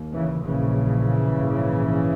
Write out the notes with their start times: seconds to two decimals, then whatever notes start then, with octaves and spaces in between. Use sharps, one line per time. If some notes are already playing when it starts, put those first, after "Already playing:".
Already playing: D#2
0.13 C#3 E3
0.44 A#1 A#2 C#3 E3
1.36 A#1 G#2